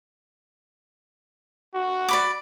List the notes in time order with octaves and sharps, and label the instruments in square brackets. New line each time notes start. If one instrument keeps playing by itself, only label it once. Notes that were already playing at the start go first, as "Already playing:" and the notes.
[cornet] F#4
[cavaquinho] D5 B5 D6